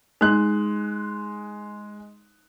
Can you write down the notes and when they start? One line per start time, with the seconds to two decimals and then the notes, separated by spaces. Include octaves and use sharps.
0.21 G#3 D#4 F#6